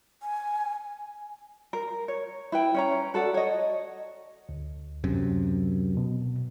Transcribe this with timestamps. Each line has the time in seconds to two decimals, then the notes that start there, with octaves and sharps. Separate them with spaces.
0.22 G#5
1.73 A#4
2.08 C#5
2.52 E4 B4 G5
2.74 C#4 C#5 A#5
3.14 F#4 A4 D5 F#5
3.34 C#5 D#5
4.49 D2
5.04 F#2 C3
5.97 B2